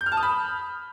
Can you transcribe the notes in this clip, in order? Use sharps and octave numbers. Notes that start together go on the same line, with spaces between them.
G6
F6
A5
D#6
B5